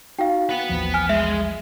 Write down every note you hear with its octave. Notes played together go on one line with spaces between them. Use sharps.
D#4 F#4 F5 G5
B4 F#5
A1 D#2 F3
G#5 F6
G#3 E5